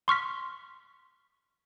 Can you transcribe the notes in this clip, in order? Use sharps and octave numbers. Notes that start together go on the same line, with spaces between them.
C6 C#6 F6 B6